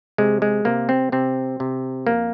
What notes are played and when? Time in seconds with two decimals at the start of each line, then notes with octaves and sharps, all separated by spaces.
0.18 C3 G#3
0.42 G#3
0.65 C3 A#3
0.89 C4
1.12 C3 C4
1.60 C3
2.07 F2 A#3